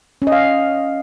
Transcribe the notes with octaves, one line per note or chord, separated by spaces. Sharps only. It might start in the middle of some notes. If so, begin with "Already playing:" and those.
C#4
D#5
F5